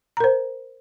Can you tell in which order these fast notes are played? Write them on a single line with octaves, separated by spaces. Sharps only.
A#5 A#4 C5